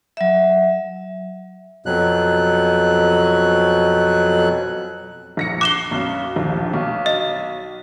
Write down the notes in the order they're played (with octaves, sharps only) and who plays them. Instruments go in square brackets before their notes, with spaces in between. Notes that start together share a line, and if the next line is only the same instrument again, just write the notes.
[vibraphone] F#3 E5
[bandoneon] F2 B2 F#3 F#6
[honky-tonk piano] A#1 A#6 C#7
[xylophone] D6 E7 G7 [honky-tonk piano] F#6 C7
[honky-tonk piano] B1 F#2
A#1 D#2
B1
[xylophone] D#5